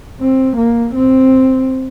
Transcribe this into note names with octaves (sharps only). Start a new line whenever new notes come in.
C4
A#3
C4